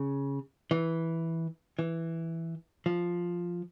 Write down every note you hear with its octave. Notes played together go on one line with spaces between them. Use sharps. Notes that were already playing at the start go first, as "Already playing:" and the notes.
Already playing: C#3
E3
E3
F3